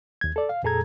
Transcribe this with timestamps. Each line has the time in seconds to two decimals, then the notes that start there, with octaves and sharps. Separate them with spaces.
0.21 D#2 G#6
0.36 A4 D5
0.49 F5
0.63 F2 A#2 G#4 A4 A#5 G#6